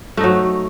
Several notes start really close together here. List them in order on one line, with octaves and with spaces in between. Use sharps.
A3 D#4 F#3